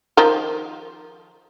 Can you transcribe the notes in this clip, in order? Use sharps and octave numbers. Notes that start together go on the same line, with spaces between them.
D#3 F3 A#4